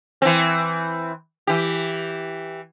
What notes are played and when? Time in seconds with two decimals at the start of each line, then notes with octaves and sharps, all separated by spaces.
0.22 E3 C4
1.47 E3 G4